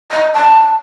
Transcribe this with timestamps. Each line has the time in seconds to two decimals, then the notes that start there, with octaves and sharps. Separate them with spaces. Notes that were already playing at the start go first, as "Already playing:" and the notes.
0.11 D#5
0.34 A5